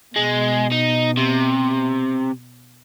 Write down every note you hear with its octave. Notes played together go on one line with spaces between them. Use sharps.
B2 G#3
D#4
C3